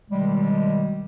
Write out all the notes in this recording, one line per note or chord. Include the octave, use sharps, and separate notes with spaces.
B2 D#3 G3 G#3